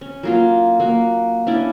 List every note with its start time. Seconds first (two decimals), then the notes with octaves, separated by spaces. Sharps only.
0.01 C#4
0.23 F#3 A#3 F4
0.80 A#3 F#4
1.47 C#4 D4 E4 D5